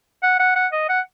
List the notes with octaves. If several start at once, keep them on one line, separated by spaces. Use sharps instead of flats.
F#5
F#5
F#5
D#5
F#5